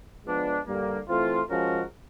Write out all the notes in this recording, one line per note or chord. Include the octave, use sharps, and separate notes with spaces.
F3 G#3 B3 D4
G2 D3 G3 A#3
E3 A3 C4 F4
F3 G#3 C#4 F#4 A#4